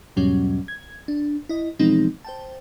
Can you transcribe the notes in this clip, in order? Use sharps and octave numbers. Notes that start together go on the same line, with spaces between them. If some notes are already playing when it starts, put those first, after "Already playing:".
E2 G#2 B2 F#3 G3 C#4
G#6
D4
E4 D#5
B2 E3 F3 G#3 C4 D#4
C5 G5 A5